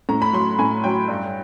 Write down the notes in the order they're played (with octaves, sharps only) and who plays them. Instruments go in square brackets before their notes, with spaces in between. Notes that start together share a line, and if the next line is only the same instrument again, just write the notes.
[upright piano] A2 A#5
B5
F#3 C6
A2 G#5
F#3 G5
G2